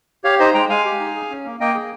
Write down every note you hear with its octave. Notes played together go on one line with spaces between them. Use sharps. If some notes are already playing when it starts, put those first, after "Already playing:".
G4 C#5 F5
D#4 C5 D#5
G#3 G5 A#5
G#3 F5 G#5
G4
D#4
G#4
C#4
A#3
A#3 D#5 G5
G#4